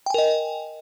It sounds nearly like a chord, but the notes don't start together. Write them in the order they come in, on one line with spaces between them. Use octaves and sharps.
G5 G#5 A#4 D#5